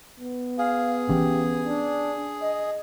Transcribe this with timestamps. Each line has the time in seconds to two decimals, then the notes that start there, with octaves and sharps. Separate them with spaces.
0.20 B3
0.59 G#4 F5
1.09 E3 C#4 G4
1.66 D4
2.42 D#5